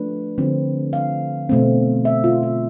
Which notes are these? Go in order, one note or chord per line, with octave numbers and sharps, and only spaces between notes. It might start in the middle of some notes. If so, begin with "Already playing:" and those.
Already playing: F3 A3 D4 B4
D3 F3 C4
F5
B2 A3 C4
E5
F4
F4